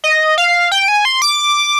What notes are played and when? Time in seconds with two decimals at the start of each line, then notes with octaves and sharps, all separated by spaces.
0.04 D#5
0.38 F5
0.72 G5
0.88 G#5
1.05 C6
1.22 D6